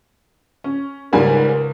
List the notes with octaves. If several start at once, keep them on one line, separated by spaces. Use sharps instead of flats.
C#4
C#2 G#2 G3 A#4 G#5